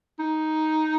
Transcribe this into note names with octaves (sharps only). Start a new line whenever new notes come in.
D#4